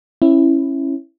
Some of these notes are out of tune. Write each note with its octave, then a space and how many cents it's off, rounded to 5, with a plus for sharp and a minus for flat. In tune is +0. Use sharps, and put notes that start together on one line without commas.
C#4 -25 E4 +0